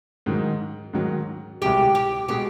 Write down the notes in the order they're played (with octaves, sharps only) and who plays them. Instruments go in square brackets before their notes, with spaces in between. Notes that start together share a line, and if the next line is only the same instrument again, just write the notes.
[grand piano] G#2 D#3 F#3
G#2 D#3 F#3
[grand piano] C2 B2 G#3 [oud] G4
[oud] G4
[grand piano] B2 G#3 [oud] G4